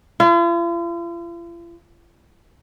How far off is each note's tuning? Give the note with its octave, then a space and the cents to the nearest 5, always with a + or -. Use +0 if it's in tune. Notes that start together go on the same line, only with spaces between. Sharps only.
F4 -45